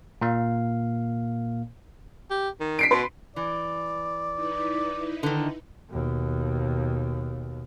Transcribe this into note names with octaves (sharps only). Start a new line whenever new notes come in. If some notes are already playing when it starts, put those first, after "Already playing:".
A#2 A#3 F5
G4
D#3
B6 C7 D7
B2 B4 C6
E3 D5
D#4 E4 B4
D3 D#3
D#2 B2